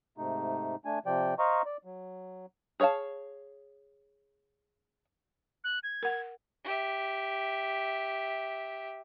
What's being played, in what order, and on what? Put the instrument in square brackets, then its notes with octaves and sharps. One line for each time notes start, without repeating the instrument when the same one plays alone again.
[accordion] G#2 C3 A3 D#4
A3 D4 G#5
C3 F3 D5 G5
C5 D#5 F5 A#5 C#6
D5
F#3
[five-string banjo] G#4 C#5 D5 F5 A5
[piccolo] F#6
G#6
[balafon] A#4 F#5
[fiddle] G4 E5